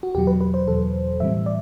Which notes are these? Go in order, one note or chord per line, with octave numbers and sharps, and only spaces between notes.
F#4
E2 B2 F#3 G4
B4
B4
C5
E2 B2 F#3 A4
A2 E3 G3 C4 E5
D5